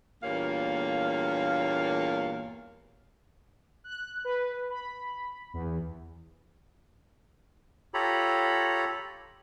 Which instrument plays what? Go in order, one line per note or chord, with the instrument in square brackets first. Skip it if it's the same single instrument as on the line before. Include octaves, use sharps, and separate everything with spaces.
[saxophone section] E2 G2 A#2 A#3 C#5 F5
[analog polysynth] F#6
B4
B5
E2
[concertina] F4 G4 A4 C#5 A#5 B5